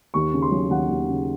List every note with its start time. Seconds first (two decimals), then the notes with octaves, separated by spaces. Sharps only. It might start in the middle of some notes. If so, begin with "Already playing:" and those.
0.14 D#2 C#6
0.33 C#3
0.42 C6
0.51 F#3
0.70 D#2 F#5
0.89 D#2
1.09 C#3